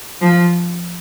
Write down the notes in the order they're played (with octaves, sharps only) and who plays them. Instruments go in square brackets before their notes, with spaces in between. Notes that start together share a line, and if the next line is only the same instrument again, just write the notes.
[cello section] F3